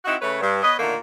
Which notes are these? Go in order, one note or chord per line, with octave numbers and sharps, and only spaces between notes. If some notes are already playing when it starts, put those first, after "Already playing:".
C4 D#4 E4 F#4
C#3 A3 B4 C#5
G2
B3 B4 C#5 D#5
A#2 D3 D#3 A3 A#3